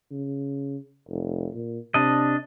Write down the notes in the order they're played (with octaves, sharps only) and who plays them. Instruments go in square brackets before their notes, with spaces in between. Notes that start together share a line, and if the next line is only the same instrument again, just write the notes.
[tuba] C#3
F1
A#2
[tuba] C3 [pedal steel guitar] D4 D#5